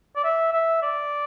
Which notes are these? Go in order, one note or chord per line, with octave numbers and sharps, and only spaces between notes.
D5
E5
E5
D5